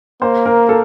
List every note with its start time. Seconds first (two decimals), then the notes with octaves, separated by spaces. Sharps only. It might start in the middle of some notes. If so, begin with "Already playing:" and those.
0.22 A#3 C5
0.46 A#4
0.69 A4